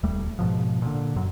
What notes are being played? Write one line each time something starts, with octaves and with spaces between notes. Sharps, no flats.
D1 D#2 G3 A3
G#2 B2 F3
A#2 D3
F#2 F#3